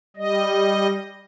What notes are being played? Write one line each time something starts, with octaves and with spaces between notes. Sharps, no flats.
G3 D#5